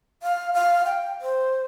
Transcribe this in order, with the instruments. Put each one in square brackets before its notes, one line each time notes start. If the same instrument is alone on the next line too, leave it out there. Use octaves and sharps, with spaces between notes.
[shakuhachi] F5
F5
G5
C5